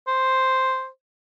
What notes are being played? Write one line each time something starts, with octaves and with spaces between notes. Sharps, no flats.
C5